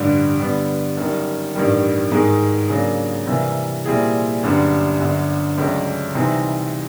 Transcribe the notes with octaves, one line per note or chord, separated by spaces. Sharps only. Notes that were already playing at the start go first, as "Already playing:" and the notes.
Already playing: A1 G2 D3 G3
D3 G3 B3
F#2 D#3 G3
A1 G2 D#3 G3
G#2 D#3 G#3
C#3 F#3 A#3 D4
C3 E3 G3 A#3
A#2 G3 C4 E4 G#4
G1 F#2 D3 G3
G1 F#2 D3
C#2 C#3 F#3 A3 D4
C3 E3 G3 C4 D#4